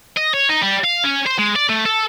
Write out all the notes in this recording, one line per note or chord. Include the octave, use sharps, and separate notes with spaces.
D#5
C#5
D#4
G3
F5
C#4
C5
G#3
D5
A3
A4